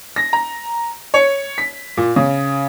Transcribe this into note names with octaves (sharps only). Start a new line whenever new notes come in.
A#6
A#5
C#5
B6
A#2
C#3